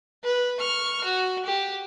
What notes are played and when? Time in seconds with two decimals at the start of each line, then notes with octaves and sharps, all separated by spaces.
0.23 B4
0.60 C#6 F6
1.04 F#4
1.45 G4